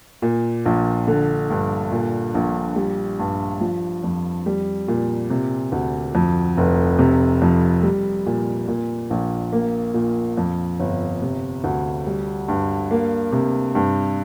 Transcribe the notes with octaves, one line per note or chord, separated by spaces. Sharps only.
A#2
A#1
D3
G2
A#2
A#1
G3
G2
F3
F2
G3
A#2
C3
D2
F2
F1
C3
F2
G3
A#2
A#2
A#1
A#3
A#2
F2
G1
C3
D2
G3
G2
A#3
C3
G2